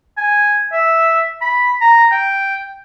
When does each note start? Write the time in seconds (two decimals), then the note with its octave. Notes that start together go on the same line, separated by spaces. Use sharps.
0.17 G#5
0.73 E5
1.41 B5
1.81 A#5
2.11 G5